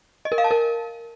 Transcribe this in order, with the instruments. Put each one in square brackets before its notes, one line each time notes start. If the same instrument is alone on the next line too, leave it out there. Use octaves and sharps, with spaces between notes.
[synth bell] D#5
A#4
F5
A5
A#4